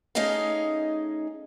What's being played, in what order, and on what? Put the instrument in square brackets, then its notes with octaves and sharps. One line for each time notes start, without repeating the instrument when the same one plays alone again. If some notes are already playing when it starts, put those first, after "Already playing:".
[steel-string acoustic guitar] A3 C#4 D#4 G#4 D#5 F5